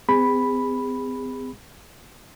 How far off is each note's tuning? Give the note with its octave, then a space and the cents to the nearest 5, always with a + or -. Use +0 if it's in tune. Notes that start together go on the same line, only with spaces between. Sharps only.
C4 -45 G#4 -35 B5 +0